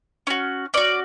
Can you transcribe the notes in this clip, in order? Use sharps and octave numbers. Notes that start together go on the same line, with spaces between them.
C#4 F#4
C#4 F#4 D5